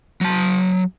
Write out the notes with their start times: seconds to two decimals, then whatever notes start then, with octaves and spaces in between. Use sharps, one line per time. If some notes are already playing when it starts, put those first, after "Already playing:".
0.21 F#3 A5